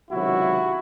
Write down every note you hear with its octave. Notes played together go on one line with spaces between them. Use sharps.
C#2 C3 D#3 F#3 E4 F#4